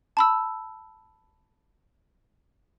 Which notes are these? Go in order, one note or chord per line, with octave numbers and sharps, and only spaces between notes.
A5 B5 E6